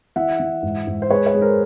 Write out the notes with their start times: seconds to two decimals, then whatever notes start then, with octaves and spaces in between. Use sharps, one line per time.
0.16 E3 E5 F#5
0.40 E3
0.63 G#2
0.87 G#2
1.02 C5
1.10 G#3 B4 C#5
1.27 B4 C#5
1.34 G#3
1.41 A#4 C5